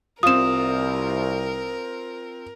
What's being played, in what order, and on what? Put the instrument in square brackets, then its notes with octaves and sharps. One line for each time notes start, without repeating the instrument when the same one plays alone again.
[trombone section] C2 [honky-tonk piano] C4 F4 [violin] A#4 [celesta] D#6 E7